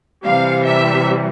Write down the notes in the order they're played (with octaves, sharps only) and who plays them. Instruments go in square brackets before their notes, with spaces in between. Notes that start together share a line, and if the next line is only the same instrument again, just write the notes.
[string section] C3 E3 G3 F5
E5